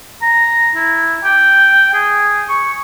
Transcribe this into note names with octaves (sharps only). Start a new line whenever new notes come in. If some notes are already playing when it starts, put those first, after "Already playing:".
A#5
E4
G5
G#4
C#6